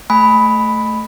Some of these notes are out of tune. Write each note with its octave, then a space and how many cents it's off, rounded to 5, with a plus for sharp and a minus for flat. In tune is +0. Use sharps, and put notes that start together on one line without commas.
A3 +0 G#5 +0 B5 +0